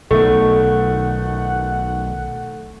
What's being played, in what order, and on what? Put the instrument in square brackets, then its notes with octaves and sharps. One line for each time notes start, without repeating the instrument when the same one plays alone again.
[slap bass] B1 D#3 [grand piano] A3 [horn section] F#5